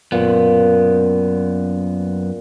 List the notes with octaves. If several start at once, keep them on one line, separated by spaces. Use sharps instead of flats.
F#2 A#2 B3